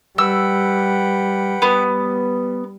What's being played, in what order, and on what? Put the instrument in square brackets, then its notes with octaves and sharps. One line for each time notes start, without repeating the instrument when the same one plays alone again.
[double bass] G3 [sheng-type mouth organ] B4 F#5 G5 [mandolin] E6
[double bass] G3 [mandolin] B3